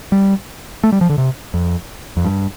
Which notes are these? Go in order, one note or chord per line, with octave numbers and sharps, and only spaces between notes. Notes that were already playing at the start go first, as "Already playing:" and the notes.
G3
A3
G3
F3
D3
C3
F2
F2
G2